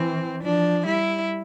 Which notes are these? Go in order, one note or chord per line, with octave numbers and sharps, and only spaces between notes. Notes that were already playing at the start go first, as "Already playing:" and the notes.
Already playing: E3 C4
F3 D4
G3 E4